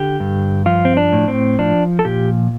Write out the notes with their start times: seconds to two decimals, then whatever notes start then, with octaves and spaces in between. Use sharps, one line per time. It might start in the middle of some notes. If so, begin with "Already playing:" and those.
Already playing: D3 G4
0.20 G2
0.66 F3 F4
0.85 C4
0.97 D4
1.13 A2
1.28 C4
1.59 F3 D4
1.99 A4
2.05 A#2 G4